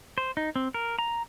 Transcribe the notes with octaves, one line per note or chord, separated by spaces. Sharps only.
C5
D#4
C4
A#4
A#5